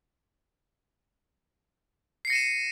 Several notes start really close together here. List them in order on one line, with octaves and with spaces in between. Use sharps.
C7 C#7 A#6 D#7 E7